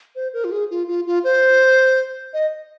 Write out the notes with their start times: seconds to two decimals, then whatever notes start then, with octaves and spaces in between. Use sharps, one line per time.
0.15 C5
0.33 A#4
0.44 F4
0.52 G#4
0.71 F4
0.88 F4
1.06 F4
1.24 C5
2.34 D#5